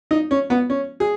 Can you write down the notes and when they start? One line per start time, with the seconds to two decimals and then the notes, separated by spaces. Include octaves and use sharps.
0.11 D#4
0.31 C#4
0.50 B3
0.70 C#4
1.00 G#4